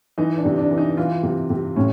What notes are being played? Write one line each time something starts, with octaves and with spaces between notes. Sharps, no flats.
E3 D#4
D4
C3
D4
E3
D#4
E3 F4
C3
C3
A2 C#4